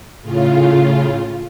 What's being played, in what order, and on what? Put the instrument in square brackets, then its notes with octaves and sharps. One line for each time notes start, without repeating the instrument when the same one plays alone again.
[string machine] A2 C#3 F4